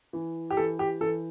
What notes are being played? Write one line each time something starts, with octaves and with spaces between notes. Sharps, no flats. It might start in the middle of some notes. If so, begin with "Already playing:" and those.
E3
G4
E3 A4
G4
E3 A4